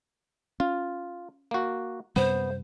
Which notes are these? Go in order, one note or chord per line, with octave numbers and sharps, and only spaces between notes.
C#4 F4
A#3 F#4
F#2 C3 G3 B3 C5